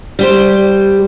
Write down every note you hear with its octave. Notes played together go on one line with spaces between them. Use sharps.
G3 G4 C5